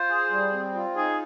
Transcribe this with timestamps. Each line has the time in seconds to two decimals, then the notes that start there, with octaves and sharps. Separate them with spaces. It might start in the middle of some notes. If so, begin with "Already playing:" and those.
Already playing: F4 C5
0.09 G#4
0.31 G3
0.53 C4
0.75 F4
0.96 D#4 G#4